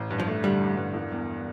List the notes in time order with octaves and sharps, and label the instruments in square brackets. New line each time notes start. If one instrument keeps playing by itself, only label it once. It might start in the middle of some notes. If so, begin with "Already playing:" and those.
Already playing: [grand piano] A1
G2
[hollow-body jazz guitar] F3
[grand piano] A3
[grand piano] D3 [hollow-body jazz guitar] G3
[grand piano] A1
G2
E1
E2